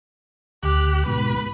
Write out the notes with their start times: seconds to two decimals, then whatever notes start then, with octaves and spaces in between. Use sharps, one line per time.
0.63 D2 G4 F#6
1.06 G#2 B2 B4